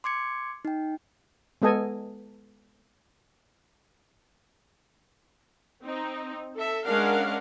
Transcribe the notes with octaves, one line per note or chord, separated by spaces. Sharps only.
C6 D6 G#6 C#7
D#4 G5
G#3 B3 A4 D#5 G#5
C4 D#4
A4 E5
G#3 C#4 D4 A#4 F5 F#5